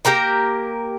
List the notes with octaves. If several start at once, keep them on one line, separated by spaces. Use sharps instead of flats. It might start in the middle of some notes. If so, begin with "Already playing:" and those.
A#3 G4 A#4 A#5